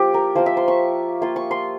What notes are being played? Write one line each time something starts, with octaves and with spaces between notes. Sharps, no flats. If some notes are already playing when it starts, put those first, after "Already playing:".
Already playing: F3 A#3 F4 G4
A#4
F3 A#3 F4 C5
E5
C6
C#6
A#3 F4 C6
C#6
C6